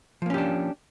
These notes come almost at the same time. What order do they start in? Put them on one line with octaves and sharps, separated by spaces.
F3 A#3 C#4 G4 D4